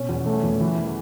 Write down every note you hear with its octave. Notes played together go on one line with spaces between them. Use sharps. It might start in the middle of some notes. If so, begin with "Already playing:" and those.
Already playing: B2 C#4
E2
A3
E2
E3